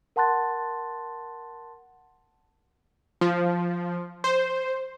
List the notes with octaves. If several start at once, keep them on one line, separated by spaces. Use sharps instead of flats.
A#4 F#5 A5 C6 F#6 A6
F3
C5